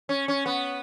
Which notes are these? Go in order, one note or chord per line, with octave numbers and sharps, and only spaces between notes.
C#4
C#4
B3